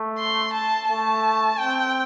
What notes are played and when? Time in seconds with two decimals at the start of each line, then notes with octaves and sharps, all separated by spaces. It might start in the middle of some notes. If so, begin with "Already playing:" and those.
Already playing: A3
0.18 C6
0.54 A5
0.89 A3 A5
1.59 C4 G5